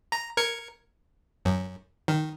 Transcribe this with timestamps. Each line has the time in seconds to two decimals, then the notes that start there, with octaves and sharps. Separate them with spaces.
0.12 A#5
0.37 A#4 G#6 C#7
1.45 F#2
2.08 D#3